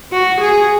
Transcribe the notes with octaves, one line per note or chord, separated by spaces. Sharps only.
F#4
G#4